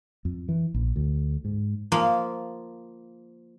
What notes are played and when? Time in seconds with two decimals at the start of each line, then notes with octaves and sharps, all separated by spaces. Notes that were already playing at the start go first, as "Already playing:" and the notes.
0.25 F2
0.49 E3
0.74 A#1
0.96 D2
1.45 G#2
1.92 F3 A#3